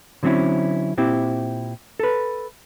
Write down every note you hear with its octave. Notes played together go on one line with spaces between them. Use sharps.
D3 F#3 C4 C#4 E4
A#2 C4 E4 G4
A4 B4